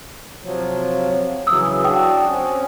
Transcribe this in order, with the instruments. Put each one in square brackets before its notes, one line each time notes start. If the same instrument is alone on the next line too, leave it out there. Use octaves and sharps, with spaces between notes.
[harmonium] C3 F3 F#3
[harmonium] C#3 E3 F#3 [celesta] D#6 E6
[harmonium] D4 F#4 [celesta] G5 D#6
[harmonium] C4 C#4